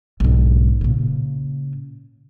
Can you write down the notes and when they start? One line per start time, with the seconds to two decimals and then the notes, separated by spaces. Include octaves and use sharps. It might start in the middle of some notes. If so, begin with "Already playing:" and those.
0.20 B1 G#2
0.81 A#2 C#3